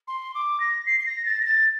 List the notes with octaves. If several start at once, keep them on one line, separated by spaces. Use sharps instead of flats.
C6
D6
A#6
C7
C7
A#6
A6
A#6
A6